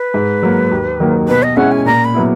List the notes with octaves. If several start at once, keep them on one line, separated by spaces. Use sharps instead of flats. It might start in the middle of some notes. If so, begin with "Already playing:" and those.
Already playing: B4
G#2
F#3 A#3
D#2
D#3 F#3 A#3
B2 B4
D#5
G#3 C#4 E4 F#5
G#5
A#2 A#5
B5
F#3 B3 E4